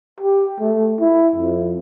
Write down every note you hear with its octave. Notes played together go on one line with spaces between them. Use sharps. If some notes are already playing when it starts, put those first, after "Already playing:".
G4
A3
E4
F2